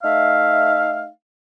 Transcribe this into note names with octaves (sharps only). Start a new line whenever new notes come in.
A3 D#4 E5 F5